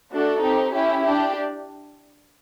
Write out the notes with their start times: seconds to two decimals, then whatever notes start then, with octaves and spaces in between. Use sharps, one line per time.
0.12 A3 D4 F#4 A4
0.43 C4 D#4 G4
0.74 C#4 E4 G4
1.04 D4 G4